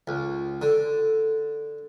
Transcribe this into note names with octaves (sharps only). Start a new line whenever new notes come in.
C#2
D3